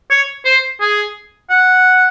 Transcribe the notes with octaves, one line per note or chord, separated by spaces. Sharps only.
C#5
C5
G#4
F#5